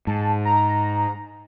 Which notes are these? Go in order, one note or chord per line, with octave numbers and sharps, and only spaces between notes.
G#2 A5
A#5